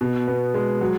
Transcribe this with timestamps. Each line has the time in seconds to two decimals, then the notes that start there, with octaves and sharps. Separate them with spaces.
0.01 B2
0.28 B3
0.54 G#3
0.81 F#3